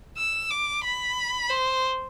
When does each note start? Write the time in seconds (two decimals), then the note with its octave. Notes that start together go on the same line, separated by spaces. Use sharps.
0.17 E6
0.51 D6
0.84 B5
1.50 C5